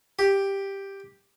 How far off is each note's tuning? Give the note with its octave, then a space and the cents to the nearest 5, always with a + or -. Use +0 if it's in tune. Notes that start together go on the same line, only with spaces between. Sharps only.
G4 +5